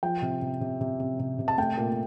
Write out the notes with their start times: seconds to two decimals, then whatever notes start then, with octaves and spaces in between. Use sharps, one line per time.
0.03 F3 G5
0.22 C3
0.42 C3
0.61 C3
0.81 C3
1.00 C3
1.19 C3
1.39 C3
1.48 A5
1.58 A3 G5
1.77 A#2